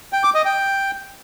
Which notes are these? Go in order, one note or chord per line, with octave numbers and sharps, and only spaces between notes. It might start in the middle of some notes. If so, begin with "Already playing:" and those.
G5
D6
D#5
G5